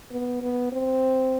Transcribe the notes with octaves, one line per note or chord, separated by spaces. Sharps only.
B3
B3
C4